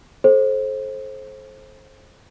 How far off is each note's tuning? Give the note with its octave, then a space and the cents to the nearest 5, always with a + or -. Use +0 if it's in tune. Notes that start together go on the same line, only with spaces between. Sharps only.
A4 -35 C5 +25